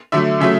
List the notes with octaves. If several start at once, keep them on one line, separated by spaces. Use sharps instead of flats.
D3 F#3 A3 E5
C#3 F#3 A3 E5